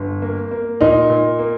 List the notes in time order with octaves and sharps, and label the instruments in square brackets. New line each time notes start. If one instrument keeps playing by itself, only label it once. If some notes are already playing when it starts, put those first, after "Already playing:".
Already playing: [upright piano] G1
A#3
A#3
[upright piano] A#2 [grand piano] D#4
[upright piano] A#2
A#3